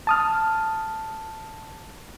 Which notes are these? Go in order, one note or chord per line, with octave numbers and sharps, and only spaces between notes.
A5 D#6 F6